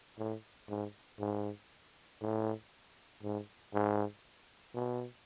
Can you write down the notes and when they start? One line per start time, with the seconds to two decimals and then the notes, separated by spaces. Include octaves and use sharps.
0.18 A2
0.69 G#2
1.19 G#2
2.21 A2
3.23 G#2
3.74 G#2
4.74 B2